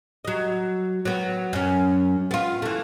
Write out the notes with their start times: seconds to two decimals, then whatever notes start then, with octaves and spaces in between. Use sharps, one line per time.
0.25 F#3 D#5
1.05 F#3 B3
1.53 F#2 C#4
2.31 B3 F4
2.62 E3 A3